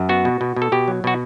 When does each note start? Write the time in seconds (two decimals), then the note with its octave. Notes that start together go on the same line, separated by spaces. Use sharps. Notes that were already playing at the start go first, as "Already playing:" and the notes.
Already playing: F#2
0.09 B3 F#4
0.25 B2
0.41 B2
0.56 B2
0.62 A4
0.72 B2 G4
0.88 F#3
1.04 B2 F#4